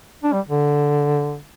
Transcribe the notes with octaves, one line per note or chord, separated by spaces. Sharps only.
D4
G3
D3